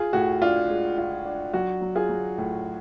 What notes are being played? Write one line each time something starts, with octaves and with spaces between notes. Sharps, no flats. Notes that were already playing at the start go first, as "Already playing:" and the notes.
Already playing: F4 G#4
A2 F#4
D4 F4
G#3
F4
D4
F#3 F#4
F#3
F4 G#4
F#3
A2